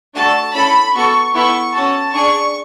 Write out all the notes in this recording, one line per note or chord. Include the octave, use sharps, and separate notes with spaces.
A3 D4 F#4 A4 A5
C#4 E4 A4 B5
B3 F#4 A4 C#6
B3 E4 A4 C#6
C#4 F#4 A4 A5
D4 G#4 C#6